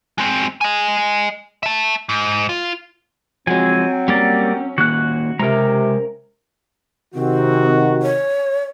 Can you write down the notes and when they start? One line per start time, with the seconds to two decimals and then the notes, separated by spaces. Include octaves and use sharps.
0.18 G#3 C4
0.61 D#5 G#5
1.63 E5 A5
2.09 G#2
2.49 F4
3.47 F3 F#3 G#3 C4 G#5
4.08 G3 A#3 C#4 D5
4.78 D#3 A#3 C#4 F#4 F#6
5.39 C3 G#3 C#4 A#4 A#5
7.14 C3 D#3 C4 F#4
8.02 C#5